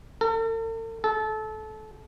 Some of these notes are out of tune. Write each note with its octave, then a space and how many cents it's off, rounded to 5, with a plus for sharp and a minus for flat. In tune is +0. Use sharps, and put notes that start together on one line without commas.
A4 +45
A4 -25